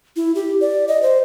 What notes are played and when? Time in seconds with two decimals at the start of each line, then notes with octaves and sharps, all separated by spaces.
0.16 E4
0.35 G4
0.61 D5
0.88 D#5
1.02 C5